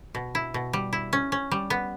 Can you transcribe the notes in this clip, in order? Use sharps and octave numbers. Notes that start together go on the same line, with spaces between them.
B2
E4
B2
G3
E4
C#4
C#4
G3
B3